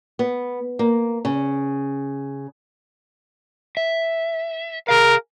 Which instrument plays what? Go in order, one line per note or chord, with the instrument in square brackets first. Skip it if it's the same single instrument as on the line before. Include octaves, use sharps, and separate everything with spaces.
[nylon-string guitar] B3
A#3
C#3
[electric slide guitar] E5
[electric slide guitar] G#4 F5 [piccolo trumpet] A#4